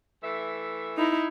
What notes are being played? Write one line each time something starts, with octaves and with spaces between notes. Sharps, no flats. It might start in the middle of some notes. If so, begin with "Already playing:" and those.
E3 A3 E5
D#4 E4